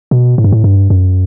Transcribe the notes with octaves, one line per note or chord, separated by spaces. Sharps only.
B2
A2
G2
A2
G2
F#2